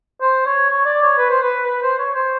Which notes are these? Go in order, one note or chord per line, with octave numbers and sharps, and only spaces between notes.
C5
C#5
C#5
D5
C#5
B4
C5
B4
B4
C5
C#5
C5